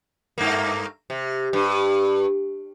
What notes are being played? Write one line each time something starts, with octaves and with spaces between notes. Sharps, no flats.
G2 A3 A#3
C3
G2